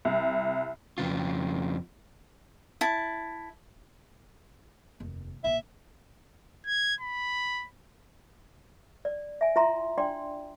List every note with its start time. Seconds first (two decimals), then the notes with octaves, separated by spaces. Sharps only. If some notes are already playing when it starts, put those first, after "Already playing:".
0.05 C2
0.98 F2 C#3 F4
2.81 E4 A5
5.00 F1 D#2
5.44 A#1 C#3 E5
6.66 G#6
7.01 B5
9.05 D5
9.41 E5 G#5
9.56 E4 F4 E5 A#5 C6
9.98 D4 D5 G5 C6